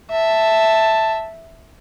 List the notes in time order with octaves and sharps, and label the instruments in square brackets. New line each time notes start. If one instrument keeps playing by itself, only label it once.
[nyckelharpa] E5 [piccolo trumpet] A5